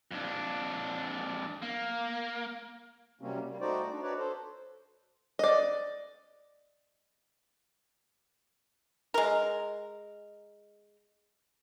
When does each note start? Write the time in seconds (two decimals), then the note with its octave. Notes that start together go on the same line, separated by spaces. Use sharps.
0.11 F2 D4
1.62 A#3
3.21 C3 F#3 G3 A#3 C4 C#4
3.48 G3 A#3
3.61 A3 D#4 F#4 C5 D5 G5
3.91 D4 D#4
4.03 D#4 F#4 B4 C#5 D5
4.18 A4 C5
5.39 D5 D#5
9.14 G#3 A#4